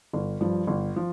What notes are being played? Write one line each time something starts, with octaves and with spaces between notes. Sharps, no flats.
G1
G2 F3
G1
F3